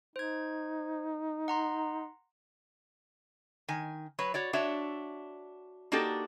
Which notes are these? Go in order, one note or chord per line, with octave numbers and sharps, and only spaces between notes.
D#4 C5 G#6
F#5 A#5 C6
D#3 G#5
F#3 B4 C#5
F#4 C#5 D5
D4 F#4 C#5 E5
A#3 D4 D#4 F#4 G4 A4